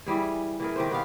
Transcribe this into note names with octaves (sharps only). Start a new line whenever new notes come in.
E3 G3 G#4
E3 G#4 A#4
D#3 G4 C5
B3 G4 F5